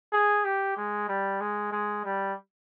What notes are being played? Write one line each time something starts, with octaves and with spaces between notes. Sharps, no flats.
G#4
G4
G#3
G3
G#3
G#3
G3